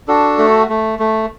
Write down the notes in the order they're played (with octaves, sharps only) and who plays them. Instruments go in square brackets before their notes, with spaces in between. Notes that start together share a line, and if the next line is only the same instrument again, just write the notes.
[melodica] D4 F#4 A4
A3
A3
A3